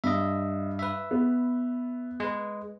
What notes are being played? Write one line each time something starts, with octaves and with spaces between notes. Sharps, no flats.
G2 D#5 E5
B4 E5
B3
G#3 B4